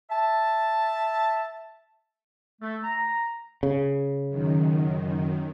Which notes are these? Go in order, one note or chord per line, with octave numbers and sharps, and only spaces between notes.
E5 A5
A3
A#5
C#3
F#2 D#3